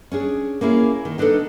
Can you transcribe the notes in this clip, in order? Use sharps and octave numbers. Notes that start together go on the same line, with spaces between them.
C#4 D4 G#4
A#3 C#4 E4 G#4
D#3
B3 D4 D#4 G4 A4